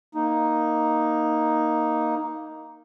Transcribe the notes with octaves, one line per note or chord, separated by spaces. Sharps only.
A#3 D#4